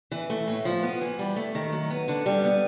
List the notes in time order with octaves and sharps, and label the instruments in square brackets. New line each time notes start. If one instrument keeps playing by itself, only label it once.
[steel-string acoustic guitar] E3
A3
A2
F3
B3
E3
G3
A3
D#3
F#3
B3
D3
G3
B3